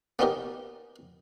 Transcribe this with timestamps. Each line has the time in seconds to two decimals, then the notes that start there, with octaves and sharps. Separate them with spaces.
0.19 A#3 B3 C#4 D#4 G4 A#4